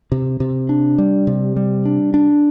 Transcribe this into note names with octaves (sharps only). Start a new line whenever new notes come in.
C3
C3
D4
G3
C3
G3
D4
D4